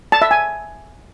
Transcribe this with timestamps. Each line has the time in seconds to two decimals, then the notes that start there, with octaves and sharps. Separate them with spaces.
0.12 A5
0.22 E5
0.31 G#5